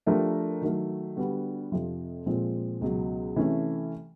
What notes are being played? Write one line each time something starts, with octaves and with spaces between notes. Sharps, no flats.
F3 A3 D4 G4 A#4
D#3 F#3 A3
D3 G3 B3 D4 F#4
F2 C3 F3
A#2 F3 G#3 C4 F4
C#2 B2 F#3
C3 E3 A3 C#4